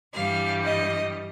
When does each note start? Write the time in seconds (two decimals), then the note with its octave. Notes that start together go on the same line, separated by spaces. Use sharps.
0.13 G2 E3 G3 F5
0.62 D#5